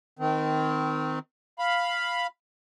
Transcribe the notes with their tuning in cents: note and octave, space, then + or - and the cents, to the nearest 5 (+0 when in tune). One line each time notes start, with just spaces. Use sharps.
D#3 +0 C4 -25
F5 +0 B5 +0